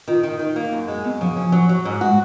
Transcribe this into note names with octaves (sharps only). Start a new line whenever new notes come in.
D#3 F4
D#3
D#3 D#4
A#3
F#2
G#3
F#2 B3
C#3 F3
F3 C#4
F#3
F#3
G#2
G#3 F#4